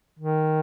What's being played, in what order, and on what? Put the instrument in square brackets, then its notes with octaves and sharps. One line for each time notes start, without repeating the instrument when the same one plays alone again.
[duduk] D#3